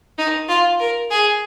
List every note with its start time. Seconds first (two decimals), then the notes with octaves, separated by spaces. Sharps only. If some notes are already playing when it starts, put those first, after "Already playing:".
0.18 D#4
0.49 F4
0.80 A#4
1.11 G#4